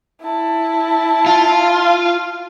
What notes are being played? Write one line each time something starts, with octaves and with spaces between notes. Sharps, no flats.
E4 A5
F4